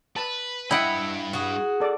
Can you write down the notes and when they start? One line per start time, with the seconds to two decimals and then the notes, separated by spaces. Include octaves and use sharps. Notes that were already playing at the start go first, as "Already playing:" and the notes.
0.16 B4 A5
0.71 G2 E4 D#5 E5 F#5 G5 B5 D#6
1.33 F#4 G#4
1.80 A4 D5